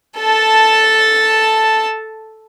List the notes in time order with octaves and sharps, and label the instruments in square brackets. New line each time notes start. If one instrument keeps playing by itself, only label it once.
[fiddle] A4 A5